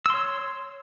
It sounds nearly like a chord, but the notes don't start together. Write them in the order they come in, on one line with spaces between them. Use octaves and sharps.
E6 C6 C#5